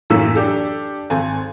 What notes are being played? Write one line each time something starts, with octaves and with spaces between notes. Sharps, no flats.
F#2 A2 E3 A#3 E6 B6
D4 G4 A4
G#1 C4 A4 G#5